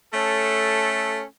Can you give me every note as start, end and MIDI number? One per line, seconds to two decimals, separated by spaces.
0.14 1.23 57
0.14 1.23 61
0.14 1.23 69